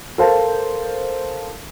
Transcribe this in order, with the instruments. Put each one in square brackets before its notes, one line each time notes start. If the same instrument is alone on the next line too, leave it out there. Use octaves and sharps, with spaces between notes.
[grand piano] A4 A#4 C5 F5 A5